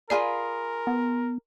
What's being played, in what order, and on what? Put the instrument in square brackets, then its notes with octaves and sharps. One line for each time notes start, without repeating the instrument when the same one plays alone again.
[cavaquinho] F4 G#4 B5 [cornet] A#4 [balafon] D5 F5
[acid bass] B3